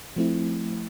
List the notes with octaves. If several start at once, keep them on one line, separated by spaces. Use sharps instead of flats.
F3 A3 C4 E4